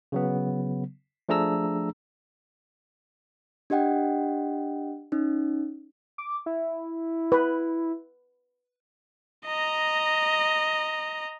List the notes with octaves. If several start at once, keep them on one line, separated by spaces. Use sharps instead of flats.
C#3 F#3 B3
F3 A3 D4 G#4 A#5 E6
D4 G4 D#5 F#5 G5
C#4 D#4
D6
E4
B4
D#5 A#5